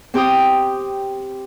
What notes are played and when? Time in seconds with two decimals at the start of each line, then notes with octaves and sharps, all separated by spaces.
0.14 C4 G4 G5 D#6